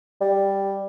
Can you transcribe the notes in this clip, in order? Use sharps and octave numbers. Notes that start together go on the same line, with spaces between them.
G3